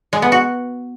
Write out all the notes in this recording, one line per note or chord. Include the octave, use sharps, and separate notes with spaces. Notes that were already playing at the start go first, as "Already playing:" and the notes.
G#3
B3
F#4